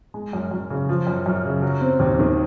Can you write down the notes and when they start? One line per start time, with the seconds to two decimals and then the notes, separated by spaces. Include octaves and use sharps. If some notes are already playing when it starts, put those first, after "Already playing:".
0.14 G#3
0.33 F#2
0.51 F#2
0.70 C#3
0.89 F3
1.07 F#2
1.26 F#2
1.45 C#3
1.62 F#3
1.81 C4
2.00 D#2
2.19 D#3